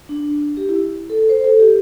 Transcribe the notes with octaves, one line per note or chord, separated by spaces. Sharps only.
D4
G4
E4
A4
C5
A4
G4